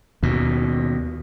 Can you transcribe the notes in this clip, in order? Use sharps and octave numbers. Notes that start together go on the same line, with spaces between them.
D#2 B2